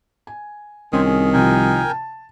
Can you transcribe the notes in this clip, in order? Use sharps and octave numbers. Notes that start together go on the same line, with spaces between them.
G#5
C2 D#3 C4 C#4 G#5
G#4
C3 F3 A#4 G5 G#5
A5